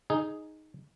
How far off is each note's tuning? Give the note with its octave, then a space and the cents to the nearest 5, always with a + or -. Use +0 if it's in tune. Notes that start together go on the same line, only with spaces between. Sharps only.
D#4 +0 G#4 +5